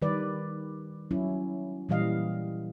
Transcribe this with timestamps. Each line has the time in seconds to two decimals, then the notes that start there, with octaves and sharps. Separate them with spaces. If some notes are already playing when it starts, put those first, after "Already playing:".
0.02 D#3 G3 B4 D5
1.11 F#3 C#4 E4
1.89 A#2 E3 G3 D#5 F5